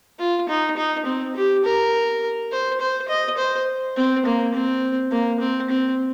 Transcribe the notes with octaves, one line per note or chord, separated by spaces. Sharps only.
F4
D#4
D#4
C4
G4
A#4
C5
C5
D#5
C5
C4
A#3
C4
A#3
C4
C4